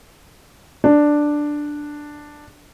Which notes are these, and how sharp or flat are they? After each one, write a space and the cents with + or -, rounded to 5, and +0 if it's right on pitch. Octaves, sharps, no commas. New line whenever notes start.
D4 +5